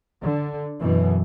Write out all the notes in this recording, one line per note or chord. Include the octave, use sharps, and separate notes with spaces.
D3
F#2 B2 E3